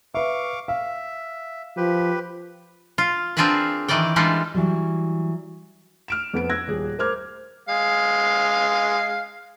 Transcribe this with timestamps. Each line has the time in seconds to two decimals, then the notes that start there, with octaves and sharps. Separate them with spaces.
0.14 B4 E5 F5 C#6 D6
0.68 E5 F5
1.77 F3 G4 B4
2.98 F4
3.37 C4 D4 F4 G#4 A#4 B4
3.88 D#3 E3 A#4 D5 G5
4.16 E3 G3 G#3 D4 D#4 F4
4.54 E3 F#3 G3
6.08 F6 D7 E7
6.34 F2 B3 D7
6.50 E6 F#6 G#6 A#6
6.68 D#1 G#4
6.99 A#4 C5 D6 F6 G#6
7.69 G#3 F5